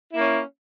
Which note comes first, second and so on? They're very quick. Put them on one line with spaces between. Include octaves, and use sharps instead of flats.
E4 A#3 C#4